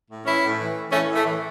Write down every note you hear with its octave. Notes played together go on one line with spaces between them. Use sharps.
A2
E3 C#4 E4
A2
E3
A2
E3 A3 C#4
A2
A3
E3